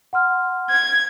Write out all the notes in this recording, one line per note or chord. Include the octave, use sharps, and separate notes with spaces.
F#5 C6 F6
G#6